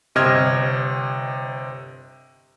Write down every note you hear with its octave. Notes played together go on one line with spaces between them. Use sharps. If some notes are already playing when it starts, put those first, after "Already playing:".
G1 C3 D#5 F6 G#6